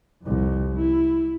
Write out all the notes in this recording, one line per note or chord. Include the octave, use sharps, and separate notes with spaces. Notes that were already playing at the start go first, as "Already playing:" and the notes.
C2 F2
E4